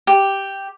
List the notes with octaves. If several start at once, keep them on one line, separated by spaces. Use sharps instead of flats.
G4